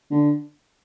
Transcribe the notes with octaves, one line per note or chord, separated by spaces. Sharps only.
D3